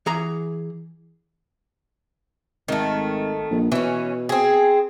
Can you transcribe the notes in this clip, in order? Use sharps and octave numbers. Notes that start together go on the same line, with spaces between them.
E3 G#4 A#5
G#1 D#3 A3
A#1
B2 E3 C#4
C4 G#4